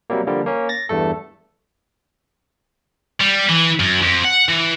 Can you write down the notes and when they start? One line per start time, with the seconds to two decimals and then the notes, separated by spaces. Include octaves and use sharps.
0.10 C3 F#3 G3 A#3
0.27 D3 F3 G3 A#3
0.46 A#3 C#4
0.69 A6 A#6
0.89 E2 G2 A3 A4
3.21 G3
3.50 E3
3.80 F#2
4.02 F2
4.25 F#5
4.49 E3